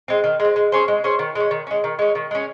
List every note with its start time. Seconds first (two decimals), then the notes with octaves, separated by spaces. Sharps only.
0.08 G#3 C4
0.24 D#3
0.40 G#3
0.45 C4
0.56 G#3
0.72 C#4 G#4 C5
0.88 G#3
1.04 C#4 G#4 C5
1.19 D#3
1.35 G#3 C#4
1.51 D#3
1.67 G#3 C#4
1.84 D#3
1.99 G#3 C#4
2.15 D#3
2.31 G#3 C#4